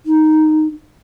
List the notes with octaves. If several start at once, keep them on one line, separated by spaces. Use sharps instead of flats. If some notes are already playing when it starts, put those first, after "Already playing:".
D#4